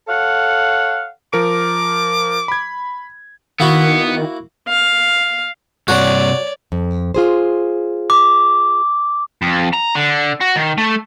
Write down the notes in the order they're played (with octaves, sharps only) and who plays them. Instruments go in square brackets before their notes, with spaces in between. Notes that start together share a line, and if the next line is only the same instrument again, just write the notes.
[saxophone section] A4 C#5 F5 F#5
[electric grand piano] F3 A#4 D7 [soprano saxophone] D6
[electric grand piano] B5 G#6
[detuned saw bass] D#3 [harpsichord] A#3 E4 F#4 [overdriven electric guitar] B3
[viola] F5
[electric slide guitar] G2 C3 [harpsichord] F#4 [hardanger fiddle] C#5 D5
[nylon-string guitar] F2
F4 G#4 C5
[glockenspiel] D6
[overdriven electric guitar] F2
A#5
D3
F#4
D#3
A3